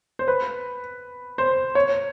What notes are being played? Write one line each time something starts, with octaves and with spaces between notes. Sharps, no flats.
C5
B4
C5
C#5